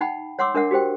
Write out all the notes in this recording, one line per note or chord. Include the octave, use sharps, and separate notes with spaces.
D#4 F#5 G5 B5
C#5 F#5 C6 D6 E6
D4 A#4 E5 F#5
F#4 G4 C5 G5